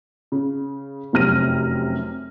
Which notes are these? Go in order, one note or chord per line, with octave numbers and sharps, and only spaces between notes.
C#3
F1 F#2 C3 F6 A#6 D#7